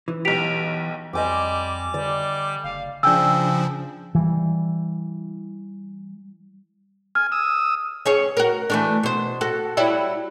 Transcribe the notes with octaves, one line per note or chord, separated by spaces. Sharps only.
E3
B1 G4 B6 D7 F7
F2 G3 D#5 G#5 C6 D6
D3 G3 D5
F#1 F5
C#3 F3 D4 G5 G#5 E6
E3 G3
G#5 F6
D#6 E6
C#4 G#4 C#5
F#4 A#4
E3 A3 D4
B2 C5
F#4 A4
F#3 G3 E4